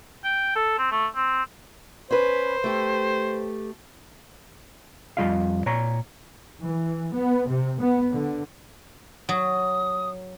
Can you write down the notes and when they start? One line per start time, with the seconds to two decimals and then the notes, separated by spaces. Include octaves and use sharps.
0.24 G5
0.56 A4
0.79 C4
0.92 A3
1.16 C4
2.11 C#4 B4 C5
2.64 A3 G4
5.17 F2 C3 G3 F4 D#5 F5
5.66 A#2 C#5 A#5
6.62 E3
7.14 B3
7.50 C3
7.80 B3
8.13 D3
9.29 F#3 D#6